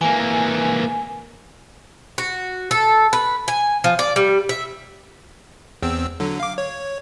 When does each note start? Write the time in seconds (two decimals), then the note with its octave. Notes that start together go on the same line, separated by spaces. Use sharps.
0.01 E3 A#3 G#5
2.18 F#4
2.71 A4
3.13 B4
3.48 G#5
3.84 F3
3.99 D5
4.16 G3
4.49 E5
5.83 E2 C4 E6
6.20 D3 F#3
6.40 F5 D6
6.58 C#5